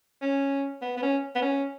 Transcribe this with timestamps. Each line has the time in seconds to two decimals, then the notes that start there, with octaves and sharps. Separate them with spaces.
0.22 C#4
0.82 B3
0.97 B3
1.02 C#4
1.35 B3
1.42 C#4